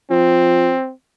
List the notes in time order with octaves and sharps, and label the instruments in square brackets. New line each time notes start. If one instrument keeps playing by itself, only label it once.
[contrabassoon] F3 [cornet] C4